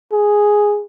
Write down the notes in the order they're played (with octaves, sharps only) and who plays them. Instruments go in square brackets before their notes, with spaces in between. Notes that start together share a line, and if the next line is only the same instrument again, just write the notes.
[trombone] G#4